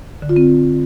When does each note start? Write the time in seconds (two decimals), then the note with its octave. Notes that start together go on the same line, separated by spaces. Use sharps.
0.22 D3
0.29 F4
0.36 C4